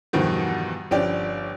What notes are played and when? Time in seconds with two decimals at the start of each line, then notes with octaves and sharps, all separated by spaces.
0.13 E2 G2 B2 D#3 F3
0.91 G1 F3 C#4 D4 G4 D5